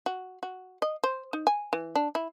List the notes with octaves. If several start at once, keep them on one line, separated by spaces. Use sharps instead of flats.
F#4
F#4
D#5
C5
D#4
G#5
E3
D4
E4